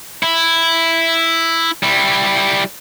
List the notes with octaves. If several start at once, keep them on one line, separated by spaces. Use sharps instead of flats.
E4
G3 E4